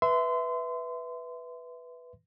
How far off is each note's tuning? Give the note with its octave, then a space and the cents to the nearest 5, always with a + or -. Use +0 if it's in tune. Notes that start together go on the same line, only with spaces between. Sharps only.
B4 +0 E5 -5 C6 -30